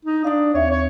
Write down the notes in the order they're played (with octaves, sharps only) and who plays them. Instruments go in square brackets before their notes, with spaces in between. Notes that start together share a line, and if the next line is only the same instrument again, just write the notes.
[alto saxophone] D#4
[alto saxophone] D4 [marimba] F5 D#6
[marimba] D#2 C4 E5 [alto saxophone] C#5
[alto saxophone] C#5